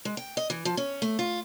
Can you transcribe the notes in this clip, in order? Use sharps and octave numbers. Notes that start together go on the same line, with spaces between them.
G#3
G5
D#5
E3
F3
C#4
A3
F4